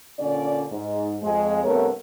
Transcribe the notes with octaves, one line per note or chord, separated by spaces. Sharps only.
A#2 D3 C#4 D5
G#2
F2 G#3
G2 C3 A3 B3 A#4 C#5